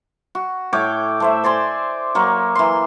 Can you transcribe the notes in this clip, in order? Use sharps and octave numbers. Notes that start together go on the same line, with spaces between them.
F#4
A2 C#5 G5 D6
A3 C5 E5
C5 D5 G#5 C6
F#3 A#3 C6 C#6
E3 C6